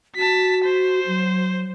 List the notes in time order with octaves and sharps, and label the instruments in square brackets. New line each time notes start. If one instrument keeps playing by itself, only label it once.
[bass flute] F#4 [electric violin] A5 B6
[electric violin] C5
[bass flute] F#3